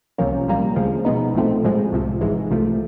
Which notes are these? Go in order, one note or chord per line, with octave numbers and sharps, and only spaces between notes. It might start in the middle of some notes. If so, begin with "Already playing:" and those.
C2 C3 F3 A#3 C#4
C2 A#2 G3 A#3
D2 C#3 F3 G#3
B2 G#3 B3 D#4
A#1 A2 F3 A3 C4
A#1 A2 F3 G#3
C2 C3 F3
A1 G#2 E3 G#3
C2 C3 F3 A3